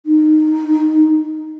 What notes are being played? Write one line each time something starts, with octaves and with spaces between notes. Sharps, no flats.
D#4